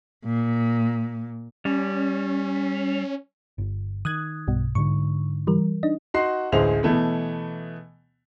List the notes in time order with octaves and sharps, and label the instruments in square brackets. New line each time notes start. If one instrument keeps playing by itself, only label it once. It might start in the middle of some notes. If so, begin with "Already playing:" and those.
[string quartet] A#2
[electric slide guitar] G3 [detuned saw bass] C#4
[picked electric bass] G1
[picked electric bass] D#3 [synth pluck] D#6 F#6 G#6
[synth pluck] B1 G2 B2
[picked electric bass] G#2 D3 [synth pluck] C#6
[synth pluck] E3 G3 A#4
D4 D#4 D#5
[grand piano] D#4 F#4 F#5 C6 C7
A1 D2 G#3 G#4 C5 F7
B2 E3 A3 B3